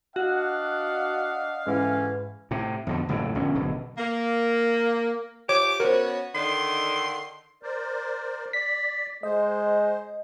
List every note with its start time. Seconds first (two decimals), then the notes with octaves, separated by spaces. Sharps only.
0.16 D4 F#4 D#5 F5 F#5
1.66 G#2 D3 E3 C#4
2.51 A2 C3
2.87 F2 B2 D3
3.09 F#1 F2 A2 C#3
3.35 A#1 B2 D3 C#4
3.55 G#1 B2 D3 F#3
3.98 A#3
5.49 F3 G4 C#5 D6
5.80 B3 C#4 F#4 A#4 C5 C#5
6.35 D3 D#3 C6
7.63 A#4 C5 D5
8.53 D5 B6
9.23 G#3 C5 D#5